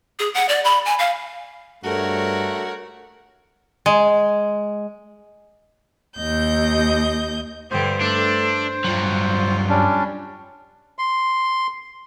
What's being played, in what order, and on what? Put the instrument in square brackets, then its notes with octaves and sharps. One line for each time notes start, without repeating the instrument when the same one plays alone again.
[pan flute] G#4
F#5
D5
B5
G#5
F5
[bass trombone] G2 [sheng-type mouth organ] A3 [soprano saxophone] F#4 [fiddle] A#4 C#5
[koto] G#3
[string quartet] D#2 D#5 G6
[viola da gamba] G2 D3 G4 [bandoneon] C5
[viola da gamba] A3 A4 [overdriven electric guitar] D4
[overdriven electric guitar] G2 F#3 [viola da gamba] F4
[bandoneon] G3 C#4 D4
C6